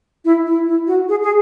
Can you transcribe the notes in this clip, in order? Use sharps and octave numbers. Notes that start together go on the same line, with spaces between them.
E4
E4
E4
F#4
G#4
G#4